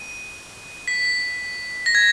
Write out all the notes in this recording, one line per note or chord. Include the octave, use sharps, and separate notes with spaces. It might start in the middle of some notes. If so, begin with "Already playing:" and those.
Already playing: D#7
B6
A#6
G#6